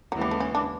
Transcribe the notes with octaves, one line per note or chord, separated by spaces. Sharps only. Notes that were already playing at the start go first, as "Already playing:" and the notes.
D#2 C#3 E3 F#3 G#3 B3
G3
A3
C#4
D4